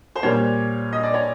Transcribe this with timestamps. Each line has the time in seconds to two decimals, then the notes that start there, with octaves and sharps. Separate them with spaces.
0.16 C5
0.23 A#2 G3 A#3 C#5
0.93 D#5
1.03 D5
1.14 C#5